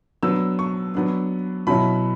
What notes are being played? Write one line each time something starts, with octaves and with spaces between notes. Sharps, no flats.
F#3 B3 D4 E6
C#6
F#3 B3 D4
B2 F#3 C#4 E4 B5